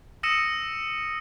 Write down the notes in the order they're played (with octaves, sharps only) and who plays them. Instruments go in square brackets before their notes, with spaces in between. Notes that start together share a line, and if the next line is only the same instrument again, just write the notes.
[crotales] D#6 E6 A#6 C#7 D#7 E7